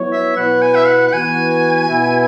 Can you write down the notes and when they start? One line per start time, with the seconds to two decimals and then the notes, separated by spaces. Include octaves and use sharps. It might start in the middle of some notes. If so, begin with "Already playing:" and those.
Already playing: F#3 B3 E4 C#5
0.12 E5
0.36 B2 B3 E4 B4 F#5
0.62 G#5
0.75 E5
0.87 F#5
1.08 F#5
1.12 E3 B3 F#4 B4 G#5
1.89 B2 B3 E4